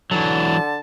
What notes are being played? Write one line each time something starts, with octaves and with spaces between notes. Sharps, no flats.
D3 E3 F#3 A5